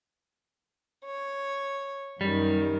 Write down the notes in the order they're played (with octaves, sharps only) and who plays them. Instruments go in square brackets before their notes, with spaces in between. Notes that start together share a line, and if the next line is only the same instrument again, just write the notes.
[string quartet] C#5
[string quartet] F#2 D#3 [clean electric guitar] G3